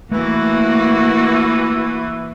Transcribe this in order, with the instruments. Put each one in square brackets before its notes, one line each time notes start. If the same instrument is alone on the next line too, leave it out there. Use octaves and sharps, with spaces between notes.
[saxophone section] E3 [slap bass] A3 [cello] A#3 F#4